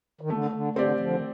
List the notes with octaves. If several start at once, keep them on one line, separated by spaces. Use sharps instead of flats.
D#3
D3 A3
D3
D3 C4 G4 D5
D3 F3
D#3